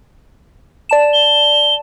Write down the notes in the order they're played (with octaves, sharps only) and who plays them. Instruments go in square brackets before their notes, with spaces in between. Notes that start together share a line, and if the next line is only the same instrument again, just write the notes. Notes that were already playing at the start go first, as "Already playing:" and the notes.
[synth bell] D5 A5 E7
[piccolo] G7